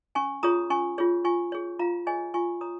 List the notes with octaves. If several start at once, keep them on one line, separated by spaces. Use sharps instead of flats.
C#4 G#5 C#6
F4 G#4 C#5 A#5 D#6
C#4 G#5 C#6
F4 G#4 C#5
F4 G#5 C#6
G#4 C#5
F4 F5 A#5
G#4 C#5 D#5 G#5
F4 G#5 C#6
C#5 A#5 D#6